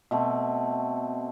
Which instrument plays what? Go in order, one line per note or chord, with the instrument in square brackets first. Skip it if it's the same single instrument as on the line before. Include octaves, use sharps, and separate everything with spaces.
[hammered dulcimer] B2 A3 C4